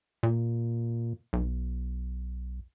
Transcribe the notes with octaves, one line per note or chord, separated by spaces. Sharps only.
A#2
B1